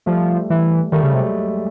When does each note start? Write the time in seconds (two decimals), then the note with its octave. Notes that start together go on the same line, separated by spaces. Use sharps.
0.06 F3 G3 A3
0.50 E3
0.92 D#3 G3 A3
1.03 C#3
1.14 C3 F#3 G#3